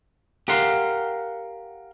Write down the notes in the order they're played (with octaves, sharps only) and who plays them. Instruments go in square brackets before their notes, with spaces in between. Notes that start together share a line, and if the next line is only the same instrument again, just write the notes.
[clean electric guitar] G4 A#4 F5 F#5 C6